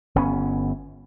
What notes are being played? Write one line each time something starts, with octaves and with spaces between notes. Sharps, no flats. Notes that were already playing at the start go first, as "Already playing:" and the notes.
G1 B3 C#4